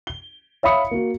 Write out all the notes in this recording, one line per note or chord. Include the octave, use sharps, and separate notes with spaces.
G7
C#5 E5 F5 B5 D#6 C#7
A#3 F#4